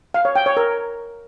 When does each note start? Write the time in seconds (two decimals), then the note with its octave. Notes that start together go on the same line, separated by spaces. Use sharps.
0.14 F5
0.25 C#5
0.36 G5
0.46 C#5
0.57 A#4